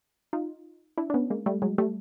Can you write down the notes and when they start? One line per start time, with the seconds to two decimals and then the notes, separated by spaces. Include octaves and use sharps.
0.33 D#4 F4
0.98 D4 E4
1.10 D4
1.14 B3 C#4
1.30 G#3 A#3
1.46 G3 A3
1.62 F#3 G#3
1.78 G3 A3